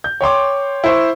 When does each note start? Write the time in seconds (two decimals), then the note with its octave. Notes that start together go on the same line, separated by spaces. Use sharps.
0.04 G6
0.21 C#5 G5 C6 D6
0.84 E4 C5 C#6